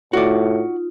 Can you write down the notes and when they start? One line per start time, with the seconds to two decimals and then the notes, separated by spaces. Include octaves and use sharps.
0.13 A2 D#4 F4 F#4 D5